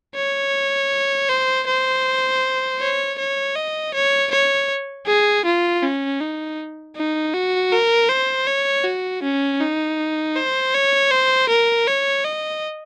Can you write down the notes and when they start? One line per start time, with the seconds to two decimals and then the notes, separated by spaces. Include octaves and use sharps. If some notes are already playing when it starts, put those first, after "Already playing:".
0.15 C#5
1.29 C5
1.67 C5
2.80 C#5
3.18 C#5
3.55 D#5
3.94 C#5
4.31 C#5
5.07 G#4
5.45 F4
5.82 C#4
6.20 D#4
6.96 D#4
7.34 F#4
7.72 A#4
8.09 C5
8.47 C#5
8.84 F#4
9.23 C#4
9.61 D#4
10.36 C5
10.74 C#5
11.11 C5
11.49 A#4
11.87 C#5
12.25 D#5